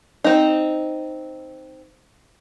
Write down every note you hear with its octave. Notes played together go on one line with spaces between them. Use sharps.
C4 D#4